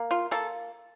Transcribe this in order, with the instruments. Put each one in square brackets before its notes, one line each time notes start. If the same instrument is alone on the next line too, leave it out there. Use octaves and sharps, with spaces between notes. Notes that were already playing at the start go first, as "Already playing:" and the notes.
Already playing: [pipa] A#3
F4
A#3 A4